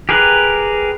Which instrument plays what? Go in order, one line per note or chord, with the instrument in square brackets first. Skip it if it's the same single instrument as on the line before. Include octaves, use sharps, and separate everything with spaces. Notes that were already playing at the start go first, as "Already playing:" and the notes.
[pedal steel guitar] G4 G#4 A#4 B4